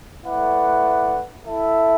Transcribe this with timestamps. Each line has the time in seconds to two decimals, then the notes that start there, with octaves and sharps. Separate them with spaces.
0.25 A3 E4 B4 D5 F#5
1.45 E4 A4 E5